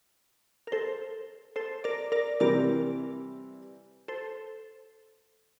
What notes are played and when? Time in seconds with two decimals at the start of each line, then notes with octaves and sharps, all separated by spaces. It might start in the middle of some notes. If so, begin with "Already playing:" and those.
0.67 A#4
0.72 A4 C5
1.56 A4 C5
1.84 A#4 D5
2.12 A#4 D5
2.40 C3 E3 G3 C4 A#4 D5
4.08 A4 C5